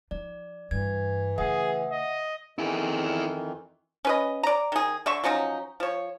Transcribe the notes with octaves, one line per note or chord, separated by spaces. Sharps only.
F3 D#4 D5
G2 E3 G#6
C#3 A3 G#4 E5 F#5 D#6
D#5
F2 D#3 E3 E4 G#4
C#4 B4 D#5
D5 A#5
D#3 G#4
D3 E5 C#6
F3 F#3 C#4 D#4
F3 C#5